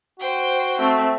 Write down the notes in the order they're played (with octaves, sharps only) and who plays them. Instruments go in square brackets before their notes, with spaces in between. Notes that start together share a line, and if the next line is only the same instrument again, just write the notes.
[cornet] F#4 [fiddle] C5 G5
[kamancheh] A3 C4